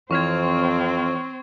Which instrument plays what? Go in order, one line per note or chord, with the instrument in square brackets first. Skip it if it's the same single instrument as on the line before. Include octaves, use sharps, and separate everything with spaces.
[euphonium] F2 [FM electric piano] E3 C#5 F6 [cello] C4 C5 [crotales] C#6 G#6